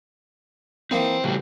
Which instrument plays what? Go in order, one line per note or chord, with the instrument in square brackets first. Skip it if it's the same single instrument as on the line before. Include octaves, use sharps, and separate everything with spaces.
[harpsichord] E3 A#3 D#4 [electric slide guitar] C4 C5
[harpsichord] A1 [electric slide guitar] C#3 F#3 G3